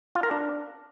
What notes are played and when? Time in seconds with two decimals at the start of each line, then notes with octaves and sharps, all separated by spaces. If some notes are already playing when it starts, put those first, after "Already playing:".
0.15 F4
0.23 A#4
0.31 D4